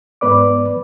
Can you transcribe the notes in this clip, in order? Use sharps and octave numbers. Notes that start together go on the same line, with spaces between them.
G#2 B3 B4 D5 D6